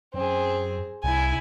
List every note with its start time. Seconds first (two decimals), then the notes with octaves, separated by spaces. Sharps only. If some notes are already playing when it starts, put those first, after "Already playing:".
0.14 F#2 C4 G#4
1.03 C2 E4 G#5